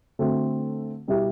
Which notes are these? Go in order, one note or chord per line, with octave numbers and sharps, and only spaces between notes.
D3 A3 C4 F#4 A4
B2 G3 B3 E4 G4